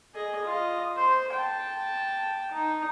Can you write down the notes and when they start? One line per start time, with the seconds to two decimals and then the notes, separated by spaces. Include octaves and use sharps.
0.15 G#4 D#5
0.45 F4 D#5
0.97 C5
1.34 G5 A5
2.52 D#4